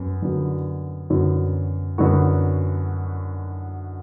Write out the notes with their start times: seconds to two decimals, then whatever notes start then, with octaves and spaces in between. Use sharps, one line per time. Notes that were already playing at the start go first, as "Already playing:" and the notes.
Already playing: F#2 B3
0.22 F#2 D3 F#3 B3 F#4
1.10 F#2 D3 F#3 B3 F#4
1.98 F#2 D3 F#3 B3 F#4